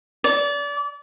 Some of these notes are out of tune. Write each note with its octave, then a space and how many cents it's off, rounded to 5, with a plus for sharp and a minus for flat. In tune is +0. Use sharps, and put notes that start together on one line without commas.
D5 -30